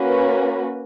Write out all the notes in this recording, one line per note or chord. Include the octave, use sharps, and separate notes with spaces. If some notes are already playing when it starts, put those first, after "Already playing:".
Already playing: A#3 C#4 F#4 B4